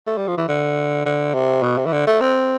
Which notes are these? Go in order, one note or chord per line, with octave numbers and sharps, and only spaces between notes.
A3
G3
F3
E3
D3
D3
C3
B2
C3
E3
D3
A3
C4